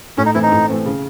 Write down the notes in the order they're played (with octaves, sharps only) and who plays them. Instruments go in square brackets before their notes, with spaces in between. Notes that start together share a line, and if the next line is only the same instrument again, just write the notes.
[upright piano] A2 [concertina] C#4
[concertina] D#4
[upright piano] E3 A3 C4 [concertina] E4
[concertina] D#4
[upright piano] A2
E3 A3 C4
C#3